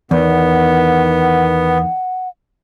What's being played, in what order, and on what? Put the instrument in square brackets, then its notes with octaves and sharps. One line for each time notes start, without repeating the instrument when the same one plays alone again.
[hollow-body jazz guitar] E2 [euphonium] D#3 [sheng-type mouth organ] B3 [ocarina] F#5